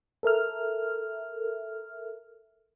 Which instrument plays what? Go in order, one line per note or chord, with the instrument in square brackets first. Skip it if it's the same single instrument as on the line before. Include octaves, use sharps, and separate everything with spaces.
[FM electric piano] A4 A#4 E5 F6